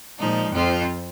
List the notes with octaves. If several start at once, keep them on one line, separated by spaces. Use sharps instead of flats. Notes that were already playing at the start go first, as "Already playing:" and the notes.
A#2 F3 G#3 D#4
F2 F3 C4 F4